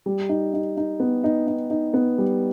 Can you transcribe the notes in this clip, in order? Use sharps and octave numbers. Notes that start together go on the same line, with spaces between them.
G3
D#4
D#4
D#4
B3
D#4
D#4
D#4
B3
G3